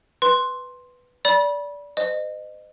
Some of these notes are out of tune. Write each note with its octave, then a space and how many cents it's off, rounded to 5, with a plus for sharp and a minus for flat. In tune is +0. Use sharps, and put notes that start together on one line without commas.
B4 +0 C6 +5
D5 -20 B5 -30
C5 -45 D#5 -25